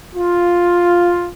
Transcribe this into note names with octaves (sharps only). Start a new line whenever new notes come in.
F4